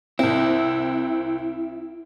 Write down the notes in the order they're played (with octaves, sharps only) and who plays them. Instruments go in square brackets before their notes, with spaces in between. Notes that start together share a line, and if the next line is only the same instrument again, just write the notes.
[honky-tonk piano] C2 C4 [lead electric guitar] E4